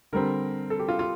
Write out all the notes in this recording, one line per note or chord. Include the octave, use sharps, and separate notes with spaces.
D3 G3 C4 A#4
A4
G4
F4
F4